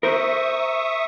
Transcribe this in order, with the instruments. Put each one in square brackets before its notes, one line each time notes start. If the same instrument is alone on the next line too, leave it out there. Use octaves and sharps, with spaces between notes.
[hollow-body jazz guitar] A#4 C5 [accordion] E5 C#6 D#6